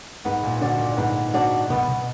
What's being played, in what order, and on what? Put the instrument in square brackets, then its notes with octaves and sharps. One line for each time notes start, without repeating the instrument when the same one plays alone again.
[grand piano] G#2 [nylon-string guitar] B3
[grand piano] A#2
[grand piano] D3 [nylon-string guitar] D4 F#4 D5
[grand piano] A#2
[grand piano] G#2 [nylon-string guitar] B3
[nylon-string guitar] D4 F#4 D5
[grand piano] B2 [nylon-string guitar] B3
[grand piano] B2